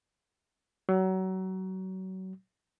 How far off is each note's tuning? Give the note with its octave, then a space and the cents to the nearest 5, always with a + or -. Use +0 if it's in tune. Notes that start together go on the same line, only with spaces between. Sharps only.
F#3 +25